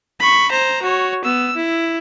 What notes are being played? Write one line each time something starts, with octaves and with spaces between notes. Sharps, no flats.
B5 C#6
C5 A#5
F#4 C#5
B3 E6
E4